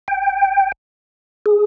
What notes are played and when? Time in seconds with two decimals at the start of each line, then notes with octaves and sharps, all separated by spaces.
0.08 G5
1.46 G#4